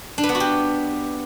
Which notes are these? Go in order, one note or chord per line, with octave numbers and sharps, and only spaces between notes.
D4
B4
B3
F#4
G4